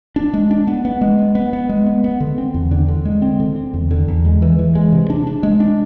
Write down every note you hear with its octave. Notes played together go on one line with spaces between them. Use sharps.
D4
G#3
D4
B3
B3
G#3
B3
B3
B3
G#3
B3
B3
D3
C4
E2
D3
D3
G#3
C4
D3
C4
E2
D3
E2
G#3
E3
E3
G#3
C3
D4
D4
G#3
D4